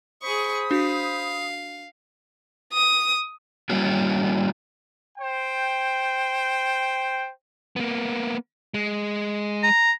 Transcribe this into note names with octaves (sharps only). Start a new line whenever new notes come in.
G#4 C5 B5 C#6 D#6
D4 F#4 F5
D#6
G3 A#3 C#4 E4 F#4
C5 G5
A#3 B3
G#3
A#5